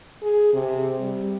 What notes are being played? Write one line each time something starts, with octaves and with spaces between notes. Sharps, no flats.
G#4
C3
G3